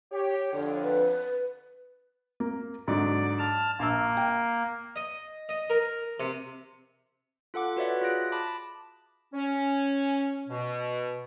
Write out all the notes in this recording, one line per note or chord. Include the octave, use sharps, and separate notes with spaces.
G4 C#5
F2 D3 C#5
B4
A#3
G#2 D3 F#3 D5
A5 F6
A#1 A#3 E6
G5
D#5
D#5
A#4
C3
F4 A4 F#5 D6
F#4 B4 C#5 D5 E5 F#5
F4 G#4 F#6 A#6 D7
A5 B5 D6
C#4
B2